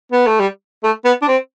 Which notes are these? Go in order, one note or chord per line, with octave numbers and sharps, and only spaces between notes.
B3
A3
G3
A3
B3
D4
C4